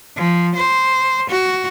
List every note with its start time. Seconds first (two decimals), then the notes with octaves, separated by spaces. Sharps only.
0.16 F3
0.55 C5
1.30 F#4